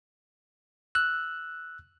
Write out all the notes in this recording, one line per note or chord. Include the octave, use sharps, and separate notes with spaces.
E6 F#6